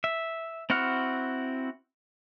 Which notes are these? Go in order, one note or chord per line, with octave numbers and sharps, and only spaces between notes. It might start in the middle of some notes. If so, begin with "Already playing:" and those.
E5
C4 E4 F#4 F#5 F6